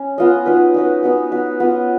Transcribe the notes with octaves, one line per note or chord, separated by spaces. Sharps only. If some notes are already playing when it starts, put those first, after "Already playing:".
Already playing: C#4
B3 F4 B4 D#5
D#4 F#4 B4
D#4 F#4 B4
B3 D#4 F#4 B4
B3 D#4 F#4 B4
B3 F4 B4 D#5